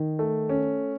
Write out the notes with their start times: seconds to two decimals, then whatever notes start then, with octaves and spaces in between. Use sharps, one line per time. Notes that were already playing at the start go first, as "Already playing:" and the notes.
Already playing: D#3
0.19 A3
0.50 C#4